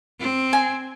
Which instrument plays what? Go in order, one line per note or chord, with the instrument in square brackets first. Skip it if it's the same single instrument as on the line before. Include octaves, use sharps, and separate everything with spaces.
[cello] C4
[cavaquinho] G#5